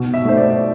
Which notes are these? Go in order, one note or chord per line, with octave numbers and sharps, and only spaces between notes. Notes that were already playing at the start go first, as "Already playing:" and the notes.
Already playing: B2
E5
A3 C5
D5
D5